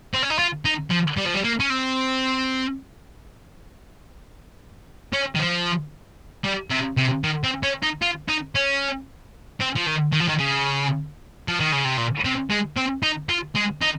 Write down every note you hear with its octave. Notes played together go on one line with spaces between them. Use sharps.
C4
C#4
D#4
F4
D#4
F3
G3
F3
G3
A#3
C#4
C4
C#4
D#3
F3
G3
C3
C3
D#3
C4
C#4
D#4
F4
D#4
C#4
C4
F3
D#3
D#3
F3
D#3
C#3
F3
D#3
C#3
C3
A#2
C3
G#3
C4
D#4
F4
G#3
D#4